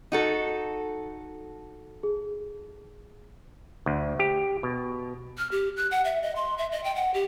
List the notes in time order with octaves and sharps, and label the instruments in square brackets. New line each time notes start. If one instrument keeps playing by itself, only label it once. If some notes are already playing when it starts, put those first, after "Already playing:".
[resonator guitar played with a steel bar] D#4 F#4 A4
[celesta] G#4
[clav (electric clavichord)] D2
G4
B2
[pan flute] F6
G4
F#6
F#5
E5
D#5
C6
E5
D#5
G5
F#5
G4